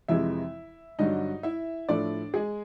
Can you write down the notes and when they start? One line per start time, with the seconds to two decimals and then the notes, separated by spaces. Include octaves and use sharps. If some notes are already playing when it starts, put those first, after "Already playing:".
0.08 F2 C3 E3 G#3 E4 E5
0.99 G2 D3 F#3 D#4 D#5
1.43 E4 E5
1.89 A2 F3 A3 D4 D5
2.34 G#3 G#4